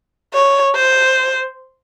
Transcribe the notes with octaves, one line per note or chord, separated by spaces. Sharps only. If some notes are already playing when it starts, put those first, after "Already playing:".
C#5
C5